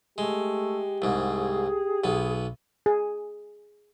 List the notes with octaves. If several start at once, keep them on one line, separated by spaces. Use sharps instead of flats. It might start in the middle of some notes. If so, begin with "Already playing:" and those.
G#3 A3 G4
C2 G#2 G#4
B1 B3
G#4